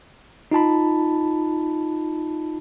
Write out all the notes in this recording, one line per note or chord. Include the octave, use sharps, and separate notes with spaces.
D#4 F4 A5 B5